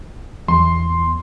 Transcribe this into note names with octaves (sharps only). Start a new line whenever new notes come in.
E2 C6